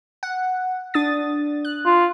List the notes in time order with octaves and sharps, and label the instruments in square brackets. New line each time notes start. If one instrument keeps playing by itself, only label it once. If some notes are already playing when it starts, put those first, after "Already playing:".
[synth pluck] F#5
D4 D#6 A6
F#6
[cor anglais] F4